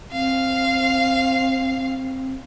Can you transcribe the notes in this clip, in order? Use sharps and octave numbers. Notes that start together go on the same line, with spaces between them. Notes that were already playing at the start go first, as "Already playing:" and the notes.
C4 F5